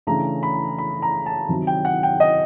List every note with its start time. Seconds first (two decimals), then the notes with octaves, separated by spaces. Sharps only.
0.07 C#3 E3 A3 D4 A#5
0.43 B5
0.78 B5
1.02 A#5
1.26 A5
1.49 C3 D#3 F#3
1.67 G5
1.85 F#5
2.03 G5
2.20 D#5